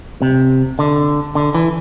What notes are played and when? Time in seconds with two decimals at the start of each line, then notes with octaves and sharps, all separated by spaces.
0.22 C3
0.79 D3
1.35 D3
1.55 E3